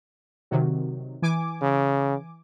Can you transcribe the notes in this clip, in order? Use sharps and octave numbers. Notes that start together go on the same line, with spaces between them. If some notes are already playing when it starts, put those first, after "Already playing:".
C3 D#3 F#3
E3 G#5 D6
C#3